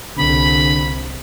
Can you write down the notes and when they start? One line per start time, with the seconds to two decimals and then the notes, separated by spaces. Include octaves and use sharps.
0.17 C2 D3 B5